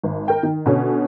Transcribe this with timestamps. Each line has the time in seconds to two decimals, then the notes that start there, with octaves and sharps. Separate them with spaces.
0.03 G#1
0.28 A#4 G5
0.43 D#3
0.66 B2 D3 C#4